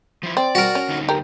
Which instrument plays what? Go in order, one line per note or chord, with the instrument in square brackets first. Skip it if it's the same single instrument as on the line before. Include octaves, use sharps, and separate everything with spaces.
[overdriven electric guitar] F3 E4
[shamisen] C4 [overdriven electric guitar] D5
[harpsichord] F#4 A#4
[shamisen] C#4
[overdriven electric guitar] D2 D#4
[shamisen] G4 A#4